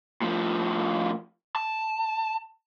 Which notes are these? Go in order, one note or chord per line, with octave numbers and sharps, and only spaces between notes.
A2 F3
A5